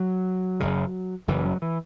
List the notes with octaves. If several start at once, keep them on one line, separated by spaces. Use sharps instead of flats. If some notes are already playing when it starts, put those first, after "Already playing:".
Already playing: F#3
F#1 F#2 C#3
F#1 F#2 C#3 E3
F#3
E3